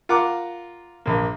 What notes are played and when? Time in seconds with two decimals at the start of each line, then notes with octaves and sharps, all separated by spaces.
0.09 F4 A#4 F#5 A#5 D6
1.06 A#1 A#3